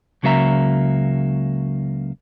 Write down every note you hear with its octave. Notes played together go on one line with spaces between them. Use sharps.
C#2 C#3 F#3 A#3 E5 A#5